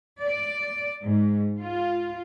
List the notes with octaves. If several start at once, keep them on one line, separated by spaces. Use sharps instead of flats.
D5
G#2
F4